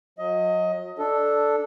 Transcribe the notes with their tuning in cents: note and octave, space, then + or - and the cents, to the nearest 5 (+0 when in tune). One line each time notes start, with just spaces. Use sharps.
F#3 -35 D#5 +20
D4 +0 A4 +0